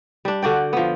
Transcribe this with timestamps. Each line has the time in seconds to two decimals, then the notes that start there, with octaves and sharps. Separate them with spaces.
0.25 G3 D4
0.42 D3 F#4 D5 G5
0.73 F3 B3